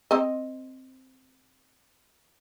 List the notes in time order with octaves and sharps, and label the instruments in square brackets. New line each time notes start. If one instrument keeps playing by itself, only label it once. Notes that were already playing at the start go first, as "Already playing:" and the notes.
[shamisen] C4 D#5